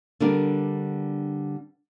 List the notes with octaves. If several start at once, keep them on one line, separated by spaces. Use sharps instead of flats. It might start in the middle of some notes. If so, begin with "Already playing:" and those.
D3 G3 B3 D4 A#4